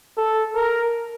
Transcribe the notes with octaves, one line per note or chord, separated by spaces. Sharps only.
A4
A#4